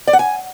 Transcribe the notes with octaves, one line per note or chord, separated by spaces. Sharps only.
D5
F#5
G#5